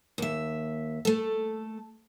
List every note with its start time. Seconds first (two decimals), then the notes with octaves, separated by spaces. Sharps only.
0.18 D#2 E5
1.05 A3 A4